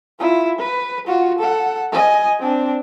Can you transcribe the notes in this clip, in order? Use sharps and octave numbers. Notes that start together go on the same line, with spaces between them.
E4 F4
B4
F4 F#4
A4 F#5
D#5 G#5
C4 D4